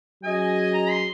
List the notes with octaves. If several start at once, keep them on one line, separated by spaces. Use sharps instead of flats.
F#3 C#4 G#4 D#5 G#5
A#5
C6